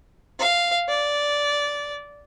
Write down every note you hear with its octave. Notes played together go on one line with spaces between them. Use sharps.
F5
D5